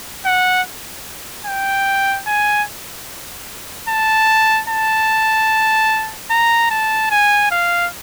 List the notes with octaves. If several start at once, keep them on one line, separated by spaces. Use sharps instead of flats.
F#5
G5
G#5
A5
A5
A#5
A5
G#5
F5